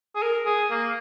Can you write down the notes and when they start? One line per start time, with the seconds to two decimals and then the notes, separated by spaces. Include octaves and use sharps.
0.15 G#4
0.22 A#4
0.46 G#4
0.71 A#3